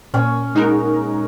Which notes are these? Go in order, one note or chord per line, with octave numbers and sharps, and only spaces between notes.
A#2 C#4
G#3 D#4 F#4 A#4